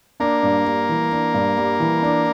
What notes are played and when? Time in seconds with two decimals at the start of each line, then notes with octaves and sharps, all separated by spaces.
0.20 A#3 D4
0.43 G2
0.65 G3
0.89 E3
1.12 D4
1.34 G2
1.58 G3
1.80 E3
2.03 D4